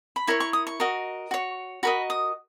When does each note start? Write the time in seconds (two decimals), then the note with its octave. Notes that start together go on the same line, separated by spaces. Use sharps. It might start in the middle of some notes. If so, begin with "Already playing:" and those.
0.16 B5
0.27 E4 A#4 C#5 C#6
0.40 C#6
0.53 D#6
0.67 C#6
0.80 F#4 A#4 D#5
1.31 F#4 C#5
1.83 F#4 A#4 D#5 B5
2.10 D#6